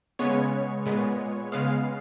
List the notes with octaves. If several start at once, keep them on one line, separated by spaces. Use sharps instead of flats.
C#3 G#3 B3 C#5
A#2 G#3 B3
C#3 G#3 B3 F5